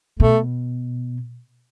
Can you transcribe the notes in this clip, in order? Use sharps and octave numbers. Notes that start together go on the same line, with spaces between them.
B2 A3